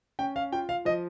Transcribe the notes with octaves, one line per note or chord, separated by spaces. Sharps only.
C#4 G5
F5
F4 G5
F5
F3 D#5